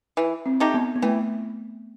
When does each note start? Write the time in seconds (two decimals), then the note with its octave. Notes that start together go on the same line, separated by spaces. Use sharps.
0.17 E3
0.46 C4
0.60 A3 D#4 G4
0.74 B3
0.96 B3
1.02 E3 A3